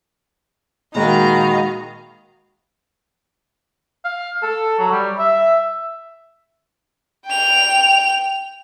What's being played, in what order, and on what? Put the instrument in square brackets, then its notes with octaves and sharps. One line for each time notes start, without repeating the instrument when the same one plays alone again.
[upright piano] A#2 G#3 [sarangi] D#3 [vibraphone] F#4 F#5 B5 [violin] F5 A#5
[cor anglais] F5
A4
F#3
G3
E5
[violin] G5 F7